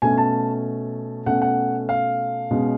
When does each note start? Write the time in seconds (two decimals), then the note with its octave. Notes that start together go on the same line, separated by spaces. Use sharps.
0.02 B2 A3 C#4 G#5
0.18 A5
1.26 B2 A3 C#4 F#5
1.42 F#5
1.89 F5
2.51 B2 G#3 C#4